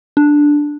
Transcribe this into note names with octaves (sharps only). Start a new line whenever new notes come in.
D4